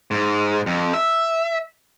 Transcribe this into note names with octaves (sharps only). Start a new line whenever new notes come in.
G#2
F2
E5